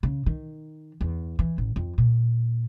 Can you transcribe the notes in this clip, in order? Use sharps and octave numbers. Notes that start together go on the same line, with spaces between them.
C#3
D#3
E2
E3
A1
F2
A#2